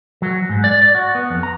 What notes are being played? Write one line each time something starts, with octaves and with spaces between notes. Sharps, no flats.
F#3
G#2
D5
D5
F#4
B3
F2
A#5